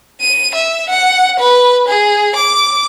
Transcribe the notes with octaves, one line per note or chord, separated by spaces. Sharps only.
D#7
E5
F#5
B4
G#4
D6